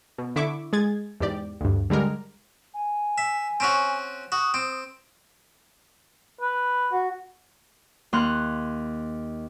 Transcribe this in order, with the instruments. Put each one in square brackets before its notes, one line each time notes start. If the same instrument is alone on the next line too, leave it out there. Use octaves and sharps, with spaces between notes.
[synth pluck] B2
D3 E4 E5 C#6 D6
G#3 G#4 G#6 A6
E2 G#2 G4 D5
D2 G2
D3 G3 G#3 A#4
[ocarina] G#5
[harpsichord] E5
C4 C#4 F#4
[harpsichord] F#4 [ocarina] D#6
[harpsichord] C4
[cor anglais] B4
[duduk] F#4
[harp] D#2 C6 F6 F#6